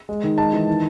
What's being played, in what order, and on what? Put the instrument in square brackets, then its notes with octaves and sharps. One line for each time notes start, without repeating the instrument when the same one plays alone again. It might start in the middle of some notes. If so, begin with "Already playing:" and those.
[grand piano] G#3
D#3
G#3 A5
E3
D#3